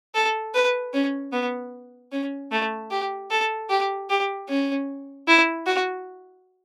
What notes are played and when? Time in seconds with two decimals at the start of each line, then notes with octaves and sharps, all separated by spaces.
0.15 A4
0.54 B4
0.94 C#4
1.33 B3
2.12 C#4
2.52 A3
2.91 G4
3.31 A4
3.70 G4
4.10 G4
4.49 C#4
5.28 E4
5.67 F#4